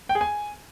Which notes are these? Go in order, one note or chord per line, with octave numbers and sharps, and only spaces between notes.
G5
G#4
G#5